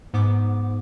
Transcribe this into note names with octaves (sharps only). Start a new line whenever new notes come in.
G#2 B3 D6